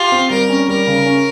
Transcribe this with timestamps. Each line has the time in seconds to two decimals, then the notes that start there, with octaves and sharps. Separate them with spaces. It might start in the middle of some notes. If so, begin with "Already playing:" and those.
Already playing: F4 G4
0.12 C4
0.30 G3 A#4
0.49 C#4
0.68 G3 A#4
0.87 C#3
1.06 C#4